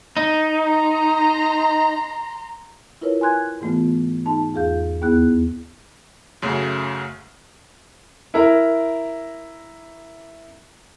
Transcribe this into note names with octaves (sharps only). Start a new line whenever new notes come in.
D#4
A#5 C6
E4 F4 A#4 B4 C#5
G#5 C6 F#6 G#6
G#2 E3 A3 B3 F4
G#2 D#4 A5
E2 F4 G#4 F5 G6
D#2 B3 E4 G#4 F#6
F#2 C#3 A3 F#4
E4 A#4 A#5